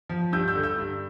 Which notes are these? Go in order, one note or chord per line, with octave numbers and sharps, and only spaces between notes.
F3
G2 E6 G6
E6 G6
D3
E6 G6
G2